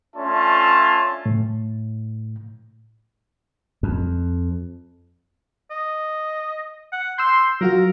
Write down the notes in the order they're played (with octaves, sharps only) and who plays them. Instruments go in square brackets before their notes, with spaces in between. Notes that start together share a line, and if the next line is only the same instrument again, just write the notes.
[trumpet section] A3 C#4 D4 F4 E5 A5
[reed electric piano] A2
[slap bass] F2
[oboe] D#5
F#5
[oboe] C6 [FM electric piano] E6 G6
[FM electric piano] F#3 F4 F#4 [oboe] A#4